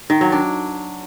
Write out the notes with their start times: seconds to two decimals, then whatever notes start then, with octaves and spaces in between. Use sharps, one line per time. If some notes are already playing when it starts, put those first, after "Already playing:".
0.10 D#3
0.21 F#3
0.32 D4